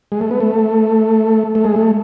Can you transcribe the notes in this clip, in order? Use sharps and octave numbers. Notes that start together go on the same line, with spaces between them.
G#3
A3
B3
A3
A3
G#3
A3